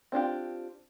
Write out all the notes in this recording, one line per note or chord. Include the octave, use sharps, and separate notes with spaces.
C4 D4 F4 G4